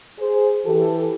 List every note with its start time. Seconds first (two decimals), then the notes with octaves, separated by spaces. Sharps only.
0.18 G#4 C5
0.66 E3 G4 A4